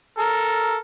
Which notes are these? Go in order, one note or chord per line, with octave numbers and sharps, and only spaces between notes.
A4 A#4